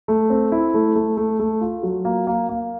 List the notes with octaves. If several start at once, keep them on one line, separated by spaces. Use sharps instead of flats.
A3
C4
E4
A3
A3
A3
A3
F4
F#3
A#3
A#3
A#3